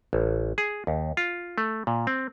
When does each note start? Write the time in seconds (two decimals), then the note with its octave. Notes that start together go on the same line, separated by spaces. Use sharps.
0.13 A1
0.58 G#4
0.87 D#2
1.17 F4
1.58 A3
1.87 A#2
2.07 C4